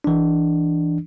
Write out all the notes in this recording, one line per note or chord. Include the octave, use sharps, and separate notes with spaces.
E3 D4